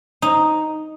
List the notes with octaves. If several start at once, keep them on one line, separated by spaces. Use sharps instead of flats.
D#4